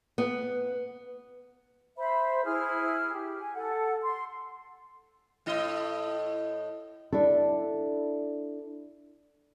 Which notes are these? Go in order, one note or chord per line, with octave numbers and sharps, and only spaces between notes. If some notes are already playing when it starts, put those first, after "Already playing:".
B3
C5 E5 B5
E4 G#4 F6
G4
G#5
A4 F#5
C6
A2 E4 D#5
D4 E4 A4